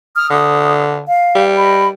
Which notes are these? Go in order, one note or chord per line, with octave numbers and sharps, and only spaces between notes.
D#6 F6
D3 D#6
F5
G3
D#5 B5